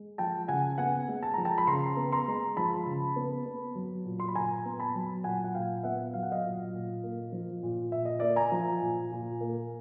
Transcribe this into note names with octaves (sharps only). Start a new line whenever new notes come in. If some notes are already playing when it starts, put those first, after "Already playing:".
Already playing: G#3
F3 G5 A5
C#3 F#5 G#5
B3 F#5 G#5
G#3
A5
F3 A#5
G5 A5
B5
C#3 A#5 C6
B3
A#5 C6
G#3
F3 A5 B5
C#3
B3
B3
F#3
A#2
C6
B5
A#2 G#5 A#5
B3
A5 B5
F#3
A#2 F#5 G#5
F#5
A#2 F5 G5
B3 E5 F#5
F#3 F5
F#5
D#5 F5
A#2
A#2
A#3
F3
A#2
A#2 E5
D#5
A#3 D5 E5
G#5 A#5
F3
A#2
A#2
A#3